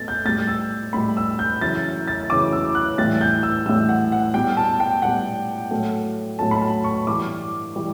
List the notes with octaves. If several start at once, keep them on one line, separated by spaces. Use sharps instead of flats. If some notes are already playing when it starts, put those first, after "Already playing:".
Already playing: B2 A3 A6
G6
A2 G3 A6
E6
A2 G3 B5
E6
G6
F#2 C#3 E3 A6
A6
F#2 C#3 E3 D6
E6
F#6
A2 E3 G3 A6
G6
E6
A2 E3 G3 E6
F#5
F#5
B2 G3 G5
A5
G5
B2 G3 F#5
A2 F#3 A3
A2 F#3 A3 A5
B5
A5
C#6
G2 E3 G3 D6
E3 G3